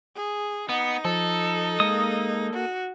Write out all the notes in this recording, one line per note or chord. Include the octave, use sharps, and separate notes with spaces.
G#4
B3 D#4
F3 A4
G#3 A#3 D#6
F#4